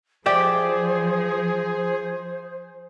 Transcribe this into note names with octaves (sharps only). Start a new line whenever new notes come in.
F3 G4 G#4 C5 D5 E5